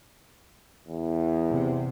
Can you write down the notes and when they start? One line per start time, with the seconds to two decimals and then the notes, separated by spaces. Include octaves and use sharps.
0.88 E2
1.49 C3